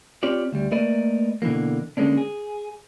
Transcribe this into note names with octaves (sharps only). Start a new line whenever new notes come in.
C4 F4 G4 C#5 D5
D2 G3
A3 A#3 A#4 B4 D5 D#5
B2 D3 E3 F3 A#3
D3 G#3 A#3 C#4 D4
G#4